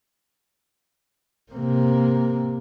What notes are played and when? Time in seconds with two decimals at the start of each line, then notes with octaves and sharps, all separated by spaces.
1.52 C3 A#3